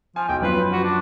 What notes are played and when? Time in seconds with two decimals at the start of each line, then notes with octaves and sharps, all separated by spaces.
0.16 F3 G#5
0.28 B1 G5
0.42 F#2 F3 B4 C6
0.72 F#4
0.84 D4